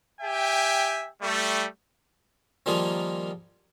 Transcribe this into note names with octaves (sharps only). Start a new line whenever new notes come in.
G4 E5 G5 G#5
G3 A3
D#3 F3 G3 A#3 F4 G#4